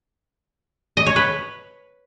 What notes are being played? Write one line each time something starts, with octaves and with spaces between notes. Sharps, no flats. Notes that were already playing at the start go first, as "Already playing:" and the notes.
D#5
C#5
B4